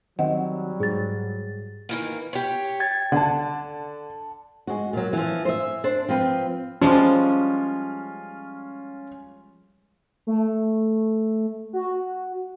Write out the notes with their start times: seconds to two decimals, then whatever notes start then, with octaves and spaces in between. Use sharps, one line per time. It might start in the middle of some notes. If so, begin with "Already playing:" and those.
0.19 D#3 F#3 G3 C4 D#5 F#5
0.80 G#2 G#4 A6
1.89 D#3 E3 A#3
2.33 G4 C#5
2.80 G5 G#6 A6
3.12 D3 F#5 A5
4.67 G#3 F#4
4.93 A#2 F#3
5.13 E3 F3
5.45 C5 E5
5.84 D4 C5
6.09 F3 C4 B4
6.81 F3 G3 G#3 C#4 F4
10.27 A3
11.73 F#4